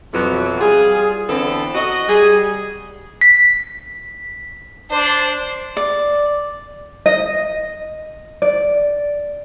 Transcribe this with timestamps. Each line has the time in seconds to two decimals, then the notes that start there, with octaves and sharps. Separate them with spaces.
0.12 F2 B2 E3 F#3
0.60 G3 F4 G#4
1.29 D3 E3 B3 C4 A4
1.74 F#4 D#5
2.08 G3 G#4
3.21 B6
4.91 D4 C5
5.77 D5
7.06 D#5
8.42 D5